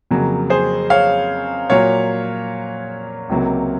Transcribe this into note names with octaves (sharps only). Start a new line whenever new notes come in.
F2 C#3 F#3 A#3
G#4 C5
C#5 F5
A#2 F#3 A#3 C#5 F5
C#2 C3 F#3 A#3